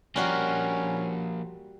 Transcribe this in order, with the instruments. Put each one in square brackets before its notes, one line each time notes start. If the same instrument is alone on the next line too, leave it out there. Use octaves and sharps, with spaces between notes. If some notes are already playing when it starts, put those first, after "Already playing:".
[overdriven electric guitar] F3 A#3 [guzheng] G3 F#4 A#4 [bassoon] C#4